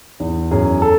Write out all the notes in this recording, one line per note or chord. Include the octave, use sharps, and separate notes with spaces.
E2
F#2 G#4
A4